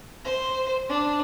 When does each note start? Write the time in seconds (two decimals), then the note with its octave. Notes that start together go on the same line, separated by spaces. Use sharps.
0.24 C5
0.88 D4